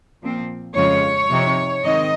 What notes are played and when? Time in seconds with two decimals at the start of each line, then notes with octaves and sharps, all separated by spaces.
0.21 A#2 F3 C4
0.75 F2 C#3 G#3 C#4 F4 C#5
1.30 C3 F3 C4 D#4
1.84 D#3 G#3 C4 D#4 D#5